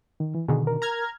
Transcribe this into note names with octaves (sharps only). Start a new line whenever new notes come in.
D#3
E3
B2 D3 D#3 G#4
A#4
A#5 F6 G#6